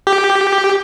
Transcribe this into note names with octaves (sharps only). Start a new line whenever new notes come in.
G4